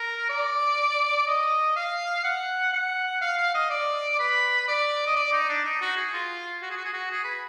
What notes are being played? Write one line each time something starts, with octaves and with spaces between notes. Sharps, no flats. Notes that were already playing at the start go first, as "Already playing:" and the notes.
Already playing: A#4
D5
D#5
F5
F#5
F#5
F5
F5
D#5
D5
B4
D5
D#5
D5
D#4
D4
D#4
F#4
G#4
F4
F#4
G#4
F#4
G#4
F#4
G#4
B4